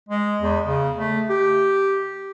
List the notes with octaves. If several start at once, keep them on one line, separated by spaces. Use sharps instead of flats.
G#3
E2
C#3
A3
G4